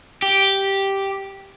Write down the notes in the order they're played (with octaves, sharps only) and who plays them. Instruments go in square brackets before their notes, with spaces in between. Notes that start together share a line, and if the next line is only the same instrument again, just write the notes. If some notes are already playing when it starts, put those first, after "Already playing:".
[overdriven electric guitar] G4